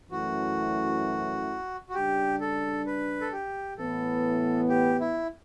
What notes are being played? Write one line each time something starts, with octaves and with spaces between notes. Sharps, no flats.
F#2 E3 A3 C#4 E4 F#4
F#4
C#3 G3 D4 G4
A4
B4
A4
G4
A2 E3 B3 A4
G4
E4